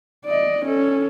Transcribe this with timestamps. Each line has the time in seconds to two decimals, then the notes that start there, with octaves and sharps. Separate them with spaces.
0.25 D5 D#5
0.65 C#4 A4